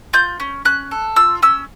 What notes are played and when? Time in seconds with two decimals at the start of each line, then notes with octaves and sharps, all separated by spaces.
0.13 F4 G6
0.40 C#4
0.65 C#4 F#6
0.91 A4
1.16 F4 E6
1.42 C#4 E6